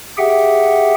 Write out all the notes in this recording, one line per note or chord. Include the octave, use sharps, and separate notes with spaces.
G4 G#4 E5 F#5 G5